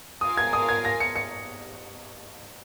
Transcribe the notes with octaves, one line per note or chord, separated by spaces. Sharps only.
F4 A#4 F5 G#5 D#6
G#6
D#6
G#6
A#6
C#7
C#7